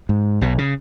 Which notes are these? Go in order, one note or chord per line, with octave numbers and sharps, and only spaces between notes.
G#2
B1 B2
C#3